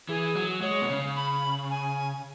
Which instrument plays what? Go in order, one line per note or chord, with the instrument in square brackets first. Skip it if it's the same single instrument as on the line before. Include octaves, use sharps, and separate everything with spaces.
[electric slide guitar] E3 [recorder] G#4
[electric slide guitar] F#3
[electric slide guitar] G#3 [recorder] C#5
[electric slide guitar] B2
C#3
[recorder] B5
G#5